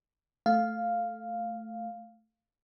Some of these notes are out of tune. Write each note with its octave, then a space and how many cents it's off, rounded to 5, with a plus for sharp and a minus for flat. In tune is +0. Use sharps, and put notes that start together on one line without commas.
A3 +0 F5 +0